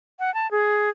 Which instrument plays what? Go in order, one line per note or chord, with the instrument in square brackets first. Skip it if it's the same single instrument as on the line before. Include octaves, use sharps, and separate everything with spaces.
[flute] F#5
A5
G#4